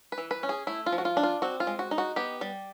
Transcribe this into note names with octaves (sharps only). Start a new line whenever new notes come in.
B4
E3
B4
C#4
G#4
A3 E4
F4
F3
F#4
F4
D4
F4
C4 F#4
F4
G#3
F#4
D#4
F#4
B3 G4
G3